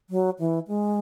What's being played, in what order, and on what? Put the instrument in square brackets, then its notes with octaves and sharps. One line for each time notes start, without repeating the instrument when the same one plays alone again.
[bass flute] F#3
E3
G#3